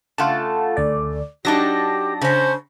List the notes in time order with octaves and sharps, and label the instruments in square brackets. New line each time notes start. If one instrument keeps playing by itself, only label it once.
[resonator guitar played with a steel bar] C#3 A3 [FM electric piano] F4 F#5 A5
[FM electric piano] D2 D5
[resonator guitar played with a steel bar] F#3 D4 D#4 [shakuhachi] G4 [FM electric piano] A5 A#6
[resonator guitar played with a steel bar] C#3 C#4 [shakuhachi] C5